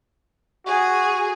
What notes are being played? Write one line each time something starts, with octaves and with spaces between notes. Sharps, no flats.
F#4 G#4